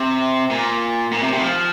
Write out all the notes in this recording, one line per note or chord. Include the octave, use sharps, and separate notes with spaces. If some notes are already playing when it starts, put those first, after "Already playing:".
Already playing: C3
A#2
A#2
C3
C3
D#3
F3